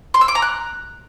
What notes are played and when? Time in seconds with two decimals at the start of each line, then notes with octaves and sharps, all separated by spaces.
0.14 C6
0.21 E6
0.28 D6
0.35 A#5
0.42 F#6